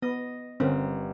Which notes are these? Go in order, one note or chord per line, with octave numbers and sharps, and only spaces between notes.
B3 D#5
G1 C4 C#4 A#4